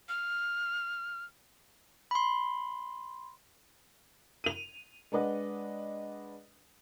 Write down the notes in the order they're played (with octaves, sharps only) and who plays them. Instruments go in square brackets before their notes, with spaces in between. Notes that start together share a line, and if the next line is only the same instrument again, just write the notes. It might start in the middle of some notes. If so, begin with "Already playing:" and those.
[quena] F6
[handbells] B5 C6
[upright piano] D#7 F7
G#3 D4 B4 D#5 F#5